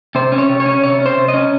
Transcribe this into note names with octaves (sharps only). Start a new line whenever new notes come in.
C3 C5
C#4
C#5
C3
C#5
C#4
C3 C#5
C#4
C5
C3
D#5
C#4